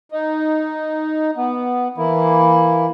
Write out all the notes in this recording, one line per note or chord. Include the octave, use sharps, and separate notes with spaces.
D#4
B3
E3 A#3 E4